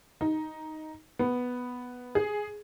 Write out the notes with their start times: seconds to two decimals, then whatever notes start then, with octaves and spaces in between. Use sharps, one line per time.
0.21 D#4
1.19 B3
2.15 G#4